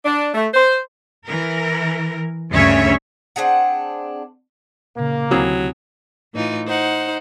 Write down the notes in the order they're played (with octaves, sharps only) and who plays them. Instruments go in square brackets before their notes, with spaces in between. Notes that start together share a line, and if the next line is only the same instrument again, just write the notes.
[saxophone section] D4
A3
C5
[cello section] E3 A#4
D2 G2 C#3 C#4 C#5 E5
[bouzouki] C4 D4 G#4 F#5
[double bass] A#2 C#3 [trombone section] A#3
[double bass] D2 [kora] C3 E4 G#4 [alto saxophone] F#3
[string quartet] A2 E3 D#4 F4
D#4 C5 F#5